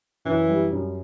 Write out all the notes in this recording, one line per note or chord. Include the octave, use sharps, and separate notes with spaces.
F#2 E3
G3
F#2